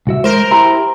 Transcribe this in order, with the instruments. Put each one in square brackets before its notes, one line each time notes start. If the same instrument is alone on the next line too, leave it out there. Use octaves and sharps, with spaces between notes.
[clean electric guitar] C2 F#4 E5
[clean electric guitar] G#3 [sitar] A#4 C5
[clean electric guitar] E4 G4 [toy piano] A#5 C6